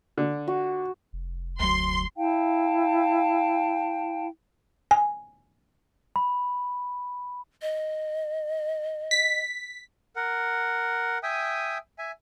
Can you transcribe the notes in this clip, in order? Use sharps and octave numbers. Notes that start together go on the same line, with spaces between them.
D3
F#4
F1
D2 F#3 C6
E4 F5 G5 A5
G#5
B5
D#5
B6
A#4 F#5
E5 G5 G#5 D#6
E5 G#5